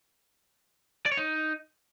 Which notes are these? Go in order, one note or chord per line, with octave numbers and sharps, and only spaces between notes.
D5
C#5
D#4